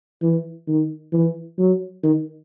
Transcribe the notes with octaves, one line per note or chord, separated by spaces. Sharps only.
E3
D#3
E3
F#3
D#3